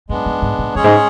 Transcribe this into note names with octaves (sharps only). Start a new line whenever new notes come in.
F#2 G#3 B3 D4
F#2
G#2
A2
F#2 G#3 C#4 G#4 C#5
G#2